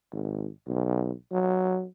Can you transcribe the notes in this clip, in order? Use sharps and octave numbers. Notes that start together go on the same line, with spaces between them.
G#1
B1
F#3